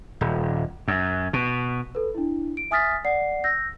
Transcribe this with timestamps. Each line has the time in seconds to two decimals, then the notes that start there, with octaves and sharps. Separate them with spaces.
0.21 D#1
0.88 F#2
1.33 B2
1.95 A4 B4
2.14 D4 E4
2.57 D7
2.71 E5 G#5 D#6 F6 A6 B6
3.05 D5 F#5 C7
3.44 E6 G6 A#6